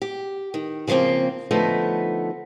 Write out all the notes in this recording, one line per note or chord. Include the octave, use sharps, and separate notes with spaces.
G4
D#3
C#3 F3 G3 A#3 C4
D3 F3 A3 B3 D#4